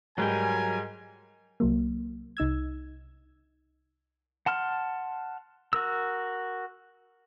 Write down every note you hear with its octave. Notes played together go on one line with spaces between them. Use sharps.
G#2 F#3 G3 A#4 B4 G5 G#5
C2 F#3 A#3
C2 D#4 E6 G#6
F#5 A5 C6 F6
F#4 A#4 E6